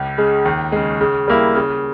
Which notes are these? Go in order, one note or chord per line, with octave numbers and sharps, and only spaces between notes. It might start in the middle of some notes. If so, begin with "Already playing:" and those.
Already playing: C#2
C#3 G#3
D#2
C#3 G#3
C#3
G3 A#3 E4
C#3